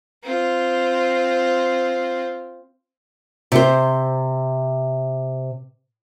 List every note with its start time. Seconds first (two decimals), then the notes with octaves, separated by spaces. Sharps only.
0.23 C4 F4
3.52 C3 C5